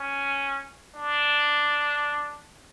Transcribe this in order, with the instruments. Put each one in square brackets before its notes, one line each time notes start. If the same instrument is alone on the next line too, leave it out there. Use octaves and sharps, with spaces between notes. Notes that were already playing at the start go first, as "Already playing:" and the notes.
Already playing: [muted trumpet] C#4
D4